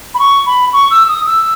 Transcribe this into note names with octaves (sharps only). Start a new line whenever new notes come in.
B5
C#6
B5
C#6
E6
D#6
E6